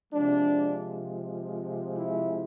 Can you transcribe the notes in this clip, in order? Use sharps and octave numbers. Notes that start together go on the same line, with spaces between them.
C3 F3 G#3 D4
E4